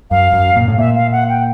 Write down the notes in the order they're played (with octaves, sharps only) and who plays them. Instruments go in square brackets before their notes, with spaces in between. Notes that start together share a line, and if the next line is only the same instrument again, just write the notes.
[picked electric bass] F#2 [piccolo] F5
[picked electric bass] F#2
A#2
A2
[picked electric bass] A#2 [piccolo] E5
[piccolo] F5
F#5
G5